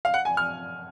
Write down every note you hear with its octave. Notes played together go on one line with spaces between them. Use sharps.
F5
F#5
G#5
F6